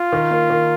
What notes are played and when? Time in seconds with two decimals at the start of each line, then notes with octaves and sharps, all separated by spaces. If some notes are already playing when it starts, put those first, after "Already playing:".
Already playing: F4
0.12 D#3
0.31 A#3
0.50 D#3